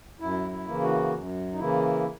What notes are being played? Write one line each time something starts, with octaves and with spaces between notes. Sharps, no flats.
F#2 E4
E4
C#3 E3 A#3
F#4
F#2
D#4
C#3 E3 A#3 E4